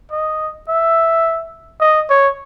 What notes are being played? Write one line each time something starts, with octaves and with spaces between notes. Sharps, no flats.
D#5
E5
D#5
C#5